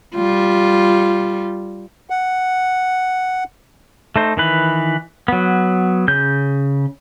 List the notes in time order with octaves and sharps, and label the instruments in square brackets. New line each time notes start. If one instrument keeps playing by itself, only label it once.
[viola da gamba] G3 F4
[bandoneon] F#5
[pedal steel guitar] A3 D#4 C5
D#3 E3 B4
F#3 B3
C#3 G6